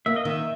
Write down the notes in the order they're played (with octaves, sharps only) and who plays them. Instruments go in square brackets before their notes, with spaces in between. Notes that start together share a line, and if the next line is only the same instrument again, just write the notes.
[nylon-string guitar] A#3 [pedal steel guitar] E5
[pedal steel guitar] D#5
[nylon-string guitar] D#3 [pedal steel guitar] E5